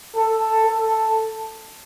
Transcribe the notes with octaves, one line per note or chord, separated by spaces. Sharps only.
A4
A4